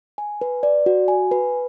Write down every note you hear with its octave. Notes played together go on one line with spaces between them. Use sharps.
G#5
B4
D5
F#4
G#5
B4